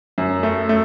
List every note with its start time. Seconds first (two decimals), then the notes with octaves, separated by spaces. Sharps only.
0.18 F#2
0.43 A3
0.69 A3